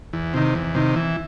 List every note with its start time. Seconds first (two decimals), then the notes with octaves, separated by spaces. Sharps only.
0.13 E2
0.34 C3 D#3
0.55 E2
0.75 C3 D#3
0.96 E3